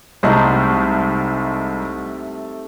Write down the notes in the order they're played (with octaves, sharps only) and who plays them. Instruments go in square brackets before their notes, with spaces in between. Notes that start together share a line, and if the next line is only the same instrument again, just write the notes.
[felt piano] C2 G#3 [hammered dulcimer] C3 A3 D#4